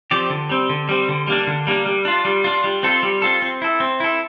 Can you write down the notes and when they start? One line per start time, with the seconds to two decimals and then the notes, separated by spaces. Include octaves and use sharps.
0.11 F3 C4 G4 D5
0.30 D3
0.50 G3 C4
0.69 D3
0.89 G3 C4
1.09 D3
1.27 G3 A#3 D4
1.47 D3
1.67 G3 A#3 D4
1.86 G3
2.05 D4 F4
2.25 G3
2.44 D4 F4
2.64 G3
2.83 C4 F4 A4
3.03 G3
3.22 C4 F4 A4
3.42 C4
3.62 E4 A4
3.80 C4
4.00 E4 A4